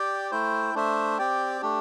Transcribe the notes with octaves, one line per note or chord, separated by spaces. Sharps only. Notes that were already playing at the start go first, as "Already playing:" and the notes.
Already playing: G4 D5 G5
A3 E4 C5 G5
A3 D4 C5 E5
C4 G4 D5 G5
A3 D4 G4